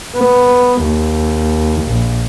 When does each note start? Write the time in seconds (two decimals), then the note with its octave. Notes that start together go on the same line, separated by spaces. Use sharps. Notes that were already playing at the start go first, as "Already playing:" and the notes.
0.17 B3
0.83 D#2
1.88 A#1